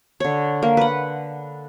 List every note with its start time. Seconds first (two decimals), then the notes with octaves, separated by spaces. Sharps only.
0.20 D3 C#5
0.63 A#3
0.77 B4 F#5